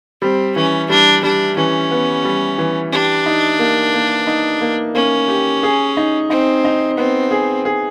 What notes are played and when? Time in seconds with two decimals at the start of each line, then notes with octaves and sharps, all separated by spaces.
0.22 G3 C4
0.56 E3 C#4
0.89 G3 D4
1.23 G3 D4
1.57 E3 C#4
1.91 B3
2.25 G3
2.58 E3
2.92 D4 G4
3.26 D#4
3.59 A#3
3.94 A#3
4.27 D#4
4.61 A#3
4.95 A#3 C#4
5.28 G4
5.63 G#4
5.97 D#4
6.30 C4 D#4
6.64 D#4
6.98 B3 C4
7.31 G#4
7.65 G#4